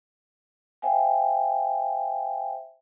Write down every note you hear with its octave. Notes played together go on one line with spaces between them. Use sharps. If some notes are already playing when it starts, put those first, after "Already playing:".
C5 E5 F5 G5 G#5